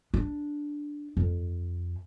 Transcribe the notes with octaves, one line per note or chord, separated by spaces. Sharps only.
D4
F2